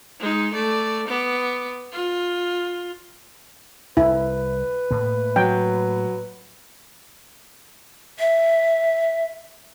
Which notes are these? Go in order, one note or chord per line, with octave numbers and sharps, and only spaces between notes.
G#3 D#4
A3 D5
B3 D6
F4
C2 E4 B4
A2 A#3
F#3 G5
E5